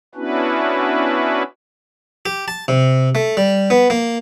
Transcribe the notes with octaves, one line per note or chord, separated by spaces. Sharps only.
B3 C#4 D4 E4 F#4 B4
G4
A5
C3
A3
G3
B3
A#3